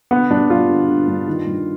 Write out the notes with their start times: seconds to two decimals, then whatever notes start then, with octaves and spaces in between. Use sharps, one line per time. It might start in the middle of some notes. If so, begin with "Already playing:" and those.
0.11 D3 B3
0.30 G2 D4
0.49 G2 F4
0.69 D3
0.88 D3
1.07 G2
1.27 D#3
1.47 G2